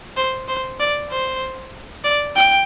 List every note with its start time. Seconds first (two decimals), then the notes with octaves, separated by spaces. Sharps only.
0.17 C5
0.48 C5
0.80 D5
1.11 C5
2.04 D5
2.35 G5